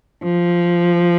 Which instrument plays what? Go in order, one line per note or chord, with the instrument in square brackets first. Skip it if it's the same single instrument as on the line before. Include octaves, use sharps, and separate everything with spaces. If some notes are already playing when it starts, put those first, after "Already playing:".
[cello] F3